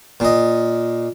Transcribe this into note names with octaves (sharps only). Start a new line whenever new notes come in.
A#2 D#5